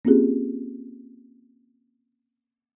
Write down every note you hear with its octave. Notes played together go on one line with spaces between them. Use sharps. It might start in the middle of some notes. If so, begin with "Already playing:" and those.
A#3 C4 C#4 F4 G4 G#4